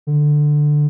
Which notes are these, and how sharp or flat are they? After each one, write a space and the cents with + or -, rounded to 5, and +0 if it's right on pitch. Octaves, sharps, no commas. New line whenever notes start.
D3 +10